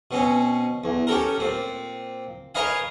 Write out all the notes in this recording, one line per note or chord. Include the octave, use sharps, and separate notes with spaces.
B2 C4 C#4
E2
C#4 G4 A4 A#4
A#2 C4
A#4 B4 C#5 D#5 F5 G#5